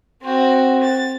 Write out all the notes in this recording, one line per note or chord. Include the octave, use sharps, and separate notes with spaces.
C4 F#4
A6